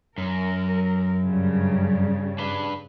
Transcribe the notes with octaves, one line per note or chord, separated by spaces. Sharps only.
F#2 A#4
G2 C#3 G3
D4 B4